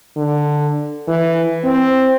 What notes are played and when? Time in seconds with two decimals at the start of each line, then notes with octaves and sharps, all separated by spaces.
0.16 D3
1.08 E3
1.64 C4